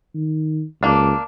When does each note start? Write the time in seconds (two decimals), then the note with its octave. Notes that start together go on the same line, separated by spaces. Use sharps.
0.15 D#3
0.83 C#2 A#3 D4